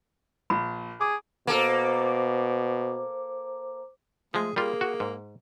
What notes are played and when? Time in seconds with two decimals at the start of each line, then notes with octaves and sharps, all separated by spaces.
0.50 A#1 B5
1.01 G#4 D6
1.47 B2 A#3 A4 C5 D6
4.34 F3 G#3 A3 G#4
4.56 G3 A#3 F4 G#4
4.81 F#4
5.00 G#2